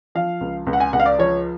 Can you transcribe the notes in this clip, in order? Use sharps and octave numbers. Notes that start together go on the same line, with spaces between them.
F3 F5
C#2
C#2
F#5
G#5
C#2 F#5
F5
D5
F3 C#5